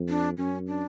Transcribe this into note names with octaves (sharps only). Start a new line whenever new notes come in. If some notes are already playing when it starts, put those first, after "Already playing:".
Already playing: F2
D4
F#2 C#4
D4